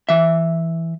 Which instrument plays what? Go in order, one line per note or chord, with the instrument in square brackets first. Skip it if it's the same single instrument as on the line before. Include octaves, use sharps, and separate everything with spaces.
[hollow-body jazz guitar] E3 E5